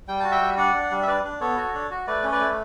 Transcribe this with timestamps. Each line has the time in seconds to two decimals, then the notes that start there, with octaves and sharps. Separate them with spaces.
0.08 G3 G5
0.20 F#4 A5
0.31 E5 G5
0.41 G3
0.57 D4 D5 F#5
0.75 D4
0.91 G3
1.03 E5
1.07 D4 B4 D5
1.24 D4
1.41 B3 A4 C#5
1.57 F#4
1.74 D4
1.91 F#4
2.07 A3 B4 D5
2.24 C#4
2.32 B4 D5
2.40 A3